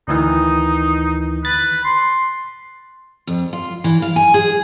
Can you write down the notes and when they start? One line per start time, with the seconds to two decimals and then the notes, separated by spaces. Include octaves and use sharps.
0.08 D2 D#3 E3 D#4
1.45 B4 A6
1.84 C6
3.27 F2
3.53 F4
3.84 E3
4.02 F5
4.16 G#5
4.34 G#4